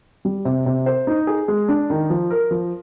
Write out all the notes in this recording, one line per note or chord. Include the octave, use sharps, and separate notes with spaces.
G3
C3
C3
C5
D#4
G#4
G#3
D4
D#3
F3
A#4
F3